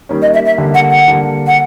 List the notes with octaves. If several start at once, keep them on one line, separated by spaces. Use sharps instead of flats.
D#3 G3 A#3 C#4
D#5
E5
E5
D3 G3 A#3
F#5
F#5
D3 G3 A#3
F#5